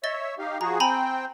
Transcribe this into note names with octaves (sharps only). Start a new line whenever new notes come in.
C#5 D#5 E5 A6 G7
D#4 G4 F5
F3 F#4 G#4 A#5
C4 G5 G#5 A#5 B5